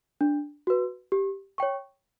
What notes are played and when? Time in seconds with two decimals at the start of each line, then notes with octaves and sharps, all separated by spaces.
0.21 D4
0.67 F#4 B4
1.12 G4
1.58 C#5 G5 C#6